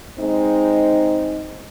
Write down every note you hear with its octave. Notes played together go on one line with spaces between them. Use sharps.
G#3 C4 D#4